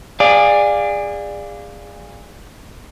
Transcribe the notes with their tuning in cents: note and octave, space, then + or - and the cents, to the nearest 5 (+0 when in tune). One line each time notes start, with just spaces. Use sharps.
G#4 -25 D5 +10 F5 +0